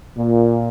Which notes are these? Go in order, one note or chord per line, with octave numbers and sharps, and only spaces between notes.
A#2